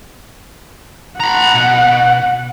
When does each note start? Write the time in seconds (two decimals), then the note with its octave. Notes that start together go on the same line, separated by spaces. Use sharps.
1.20 F#5 A#5 B5
1.54 B2